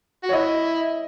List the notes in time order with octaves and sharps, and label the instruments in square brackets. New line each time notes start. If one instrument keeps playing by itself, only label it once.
[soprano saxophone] F#4
[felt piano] C#5
[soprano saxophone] E4 [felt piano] D#5